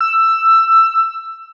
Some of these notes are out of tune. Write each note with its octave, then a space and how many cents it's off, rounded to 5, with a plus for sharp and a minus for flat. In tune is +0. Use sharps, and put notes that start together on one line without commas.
E6 +10